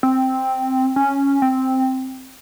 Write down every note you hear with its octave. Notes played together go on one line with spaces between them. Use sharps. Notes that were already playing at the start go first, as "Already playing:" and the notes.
C4
C#4
C4